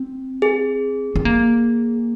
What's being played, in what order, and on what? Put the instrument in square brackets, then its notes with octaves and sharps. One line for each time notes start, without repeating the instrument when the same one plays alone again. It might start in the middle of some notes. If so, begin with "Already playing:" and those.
Already playing: [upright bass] C4
[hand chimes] G#4
[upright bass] C4
A#3